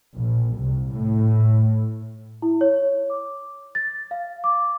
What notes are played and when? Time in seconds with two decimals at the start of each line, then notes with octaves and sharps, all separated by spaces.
0.15 A#1
0.57 C2
0.92 A2
2.42 E4
2.61 C#5
3.10 D6
3.75 A6
4.11 F5
4.44 D6